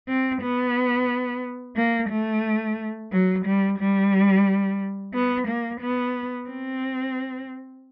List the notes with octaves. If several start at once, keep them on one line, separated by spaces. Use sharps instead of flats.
C4
B3
A#3
A3
F#3
G3
G3
B3
A#3
B3
C4